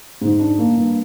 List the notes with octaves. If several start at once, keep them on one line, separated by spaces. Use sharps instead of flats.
G#2
D4
A#3
G2